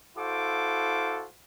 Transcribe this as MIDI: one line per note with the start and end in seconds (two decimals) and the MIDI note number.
0.17 1.26 64
0.17 1.26 66
0.17 1.26 69
0.17 1.26 72
0.17 1.26 77
0.17 1.26 86